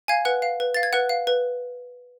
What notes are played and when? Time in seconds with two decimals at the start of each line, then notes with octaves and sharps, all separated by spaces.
0.08 F5 G#5 G#6
0.25 B4 F#5 F#6
0.42 F5
0.60 B4
0.74 F5 A6
0.83 G#6
0.93 B4 F#5 F#6
1.09 F5
1.27 B4